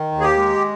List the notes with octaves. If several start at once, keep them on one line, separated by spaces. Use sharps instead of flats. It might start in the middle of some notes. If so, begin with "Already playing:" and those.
Already playing: D#3
D#2
G#4
G4
G#3